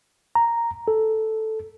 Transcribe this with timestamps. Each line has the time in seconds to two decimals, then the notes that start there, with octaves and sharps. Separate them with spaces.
0.35 A#5
0.88 A4